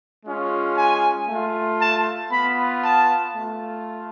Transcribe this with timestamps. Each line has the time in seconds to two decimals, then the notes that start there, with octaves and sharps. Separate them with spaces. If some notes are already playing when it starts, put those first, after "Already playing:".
0.25 G#3 C#4 F4
0.77 G#5
1.28 A3 F4
1.79 A5
2.32 B3 F4 B5
2.83 A5
3.34 A3 F4